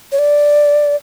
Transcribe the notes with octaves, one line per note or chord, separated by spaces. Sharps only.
C#5
D5